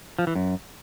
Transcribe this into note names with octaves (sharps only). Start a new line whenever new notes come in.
F3
E3
F#2